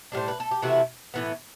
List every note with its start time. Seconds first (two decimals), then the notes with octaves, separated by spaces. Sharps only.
0.12 A2 G3 D4 C5
0.28 B4
0.40 A4
0.51 G4
0.62 C3 E3 A3 E4 F#4
1.14 A2 E3 B3